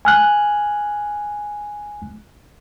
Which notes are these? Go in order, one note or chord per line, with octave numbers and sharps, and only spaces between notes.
G#5 F6 F#6